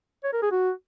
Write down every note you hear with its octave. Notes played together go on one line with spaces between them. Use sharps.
C#5
A#4
G#4
F#4